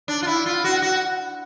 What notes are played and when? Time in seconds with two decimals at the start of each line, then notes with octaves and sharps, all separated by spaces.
0.08 D4
0.22 F4
0.27 E4
0.46 F4
0.64 F#4
0.82 F#4